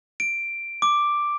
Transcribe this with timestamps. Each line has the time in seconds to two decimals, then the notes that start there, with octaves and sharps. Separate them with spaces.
0.20 D7
0.82 D6